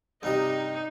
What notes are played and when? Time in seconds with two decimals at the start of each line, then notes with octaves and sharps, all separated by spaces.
0.23 G2 C3 G3 D#4 D#5